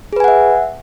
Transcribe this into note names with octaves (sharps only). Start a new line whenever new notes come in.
G#4 B4 E5 F#5 G#5